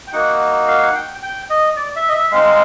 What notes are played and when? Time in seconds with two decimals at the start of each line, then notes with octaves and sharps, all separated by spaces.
0.07 G5
0.13 A#3 D#4 F#4 F#5
0.68 F5
0.83 F#5
0.95 G5
1.22 G5
1.50 D#5
1.76 D5
1.96 E5
2.09 D#5
2.13 E5
2.31 G#3 C4 D#4 F5